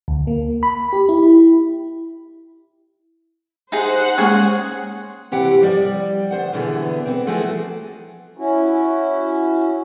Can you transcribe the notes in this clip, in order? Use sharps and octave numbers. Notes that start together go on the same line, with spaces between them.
D2
A#3
B5
G4
E4
D#4 G#4 C5 F#5
G#3 A#3 C#4 G#4 C#5
C3 E3 G4 F#5
F3 G3 D5
D2 C5 F#5
B2 D3 E3 B3 G#4 E5
B3 C4
E3 F3 A3 F#4 G#4
C#4 E4 F#4